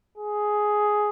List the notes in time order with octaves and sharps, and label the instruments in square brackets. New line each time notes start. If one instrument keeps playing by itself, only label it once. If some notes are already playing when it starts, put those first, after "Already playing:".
[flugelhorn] G#4